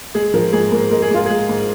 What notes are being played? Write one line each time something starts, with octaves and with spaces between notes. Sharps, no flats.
G#3 G#4
F3 A#4
G#2 G#4
G#2 A#4
G#3 A#4
G#4
G#2 F4
G#3 G#4
G#2